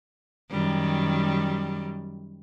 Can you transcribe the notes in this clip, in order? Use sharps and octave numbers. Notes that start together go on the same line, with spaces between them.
F#2 D#3 G3